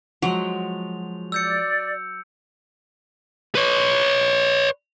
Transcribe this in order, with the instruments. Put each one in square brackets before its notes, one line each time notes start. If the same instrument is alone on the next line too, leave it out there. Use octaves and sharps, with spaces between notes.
[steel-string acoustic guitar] F3 G#3 [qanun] F#3 [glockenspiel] F7
[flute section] D5 [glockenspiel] E6 G6 C#7
[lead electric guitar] B4 C#5